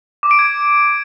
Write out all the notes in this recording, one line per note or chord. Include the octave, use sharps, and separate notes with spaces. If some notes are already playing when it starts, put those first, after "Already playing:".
D6
D7
G#6